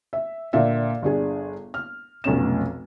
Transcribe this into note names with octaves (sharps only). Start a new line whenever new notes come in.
E5
A#2 D3 E5
G1 D4 G#4
F6
F1 B1 A3 C#4 E7